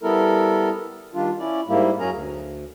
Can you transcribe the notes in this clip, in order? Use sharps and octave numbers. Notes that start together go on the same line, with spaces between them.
G3 B3 E4 A4 A#4
D#3 G3 D4 F4
C#4 E4 D5
G#2 G3 A#3 E4
F#2 F#3 C#4 G#4 A#4 A#5
D2